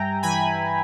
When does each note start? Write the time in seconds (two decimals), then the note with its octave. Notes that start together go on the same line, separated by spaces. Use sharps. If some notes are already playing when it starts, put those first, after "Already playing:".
Already playing: G2 G3 E5 G5 G#5 A#5
0.23 E3 G#5 B5